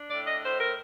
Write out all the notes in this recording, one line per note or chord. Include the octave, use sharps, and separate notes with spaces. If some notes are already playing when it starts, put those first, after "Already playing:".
Already playing: D4
A2 D5
D#5
A2 C5
A#4